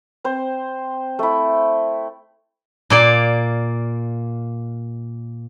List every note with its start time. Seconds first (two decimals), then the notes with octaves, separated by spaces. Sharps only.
0.24 C4 C5
1.19 A3 E4
2.90 A#2 A#3 D5